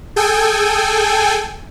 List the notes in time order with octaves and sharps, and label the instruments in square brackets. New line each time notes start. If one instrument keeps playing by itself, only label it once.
[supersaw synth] G#4 A4 G5 G#5